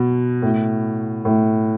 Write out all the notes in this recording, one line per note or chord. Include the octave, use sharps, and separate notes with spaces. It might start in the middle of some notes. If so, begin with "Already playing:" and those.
Already playing: B2
A2
A2